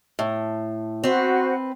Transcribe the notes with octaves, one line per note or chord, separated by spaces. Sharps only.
A2
C4 F#4 B4 C5